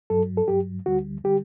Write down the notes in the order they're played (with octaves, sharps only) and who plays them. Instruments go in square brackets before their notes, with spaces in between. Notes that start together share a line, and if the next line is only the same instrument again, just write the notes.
[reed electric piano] G2 F#3 A4
A4
G2 F#3 G4
D2 D3 G3 F#4
D3 G3 G4